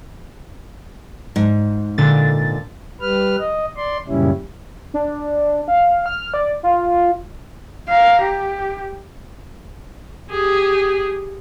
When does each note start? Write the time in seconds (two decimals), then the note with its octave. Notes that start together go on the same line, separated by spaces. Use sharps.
1.36 G#2
1.98 A#2 D3 A6
3.01 G3 B4 F6
3.39 D#5
3.77 D5 C6
4.08 F#2 A#2 C#3 G3 C#4 E4
4.94 D4
5.68 F5
6.06 F6
6.34 D5
6.63 F4
7.89 F5 A#5
8.21 G4
10.30 G4 G#4